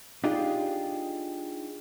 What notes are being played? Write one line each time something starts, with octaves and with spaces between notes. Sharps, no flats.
D4 D#4 F4 G4 G#4 D#5